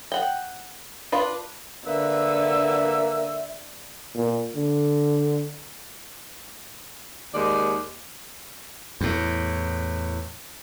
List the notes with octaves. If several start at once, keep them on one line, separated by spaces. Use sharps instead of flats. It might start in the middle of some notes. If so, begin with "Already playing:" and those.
F#5 G5
D4 F4 B4
D3 A#3 B4 E5 E6
A#2
D3
D#2 G#3 D5
E2 A2